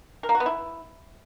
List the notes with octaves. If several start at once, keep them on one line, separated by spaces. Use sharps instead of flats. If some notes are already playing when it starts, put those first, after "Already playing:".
A#4
A#3
F#4
B3
E4